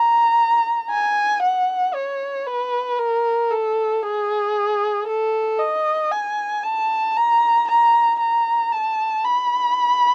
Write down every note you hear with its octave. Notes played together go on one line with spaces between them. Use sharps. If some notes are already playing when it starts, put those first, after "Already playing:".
Already playing: A#5
G#5
F#5
C#5
B4
A#4
A4
G#4
A4
D#5
G#5
A5
A#5
A#5
A#5
A5
B5